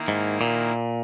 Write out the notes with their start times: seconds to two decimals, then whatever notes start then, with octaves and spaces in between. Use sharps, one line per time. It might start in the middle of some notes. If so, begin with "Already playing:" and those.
Already playing: D#3 A#3 E4
0.08 G#2
0.41 A#2